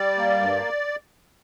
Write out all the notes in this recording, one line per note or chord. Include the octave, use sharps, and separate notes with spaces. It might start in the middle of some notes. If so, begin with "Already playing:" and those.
Already playing: G3 D5
A#3
G2